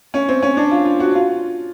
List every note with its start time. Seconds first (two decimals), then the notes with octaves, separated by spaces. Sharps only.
0.14 C#4
0.28 C4
0.42 C#4
0.57 D4
0.71 F4
0.85 F4
1.00 F#4
1.15 F4